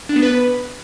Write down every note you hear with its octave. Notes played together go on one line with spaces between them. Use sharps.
D4
B3
B4